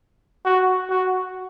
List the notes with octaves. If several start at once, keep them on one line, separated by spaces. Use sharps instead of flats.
F#4
F#4